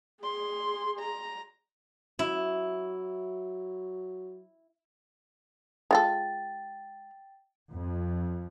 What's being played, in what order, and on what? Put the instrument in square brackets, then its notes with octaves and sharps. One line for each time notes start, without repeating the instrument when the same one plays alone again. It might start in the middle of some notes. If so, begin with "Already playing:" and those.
[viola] G#4 [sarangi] C6
[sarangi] A#5
[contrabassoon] F#3 [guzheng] E4
[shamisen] G#3 F4 A4 [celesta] G5 A6
[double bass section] F2